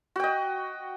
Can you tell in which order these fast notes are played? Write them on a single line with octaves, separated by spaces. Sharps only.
F#4 G5 D#5